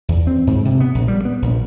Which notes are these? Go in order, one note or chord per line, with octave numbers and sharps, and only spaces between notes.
E2
C4
G#2
C3
B3
A#1
G3
B3
A#1